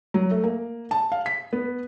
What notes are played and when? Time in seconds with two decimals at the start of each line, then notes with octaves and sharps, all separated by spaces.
0.14 F#3
0.31 A3
0.44 A#3
0.91 A5
1.12 F5
1.26 B6
1.53 B3